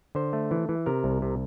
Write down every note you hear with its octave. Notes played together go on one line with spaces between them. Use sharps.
D3 C5
A3
E3
E3
C3 A#4
C2
C3